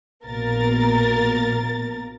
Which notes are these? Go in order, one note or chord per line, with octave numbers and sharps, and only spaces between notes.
A#1 B2 A#3 A#4 A6